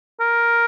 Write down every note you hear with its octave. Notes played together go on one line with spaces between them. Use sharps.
A#4